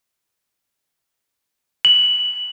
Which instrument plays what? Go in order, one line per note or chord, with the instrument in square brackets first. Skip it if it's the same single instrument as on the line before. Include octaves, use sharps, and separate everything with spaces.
[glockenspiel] F#7